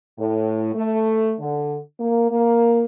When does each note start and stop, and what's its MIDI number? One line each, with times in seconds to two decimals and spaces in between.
0.19 0.70 45
0.74 1.34 57
1.40 1.78 50
1.99 2.30 58
2.31 2.84 58